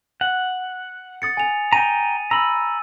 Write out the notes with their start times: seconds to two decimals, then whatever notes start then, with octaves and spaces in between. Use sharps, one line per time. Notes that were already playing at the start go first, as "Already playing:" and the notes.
0.21 F#5
1.22 D#6 A6 C#7
1.37 G#5 F7
1.73 G5 G#5 A#5 D#7
2.31 A#5 B5 E6